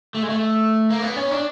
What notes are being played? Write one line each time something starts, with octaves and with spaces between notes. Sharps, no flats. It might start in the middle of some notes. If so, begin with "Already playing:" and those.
A3
G#3
A3
A#3
B3
C#4
D4